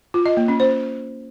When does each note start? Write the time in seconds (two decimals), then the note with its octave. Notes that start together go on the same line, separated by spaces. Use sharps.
0.14 F4
0.26 D#5
0.37 A#3
0.48 C#4
0.60 C5